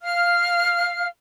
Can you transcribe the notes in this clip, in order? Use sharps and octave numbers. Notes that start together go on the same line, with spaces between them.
F5 F6